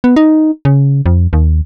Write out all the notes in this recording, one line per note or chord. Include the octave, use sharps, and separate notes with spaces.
B3
D#4
C#3
F2
D#2